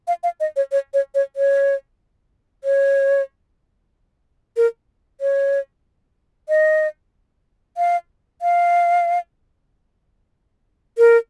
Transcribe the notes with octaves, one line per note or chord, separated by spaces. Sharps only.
F5
F5
D#5
C#5
C#5
C#5
C#5
C#5
C#5
A#4
C#5
D#5
F5
F5
A#4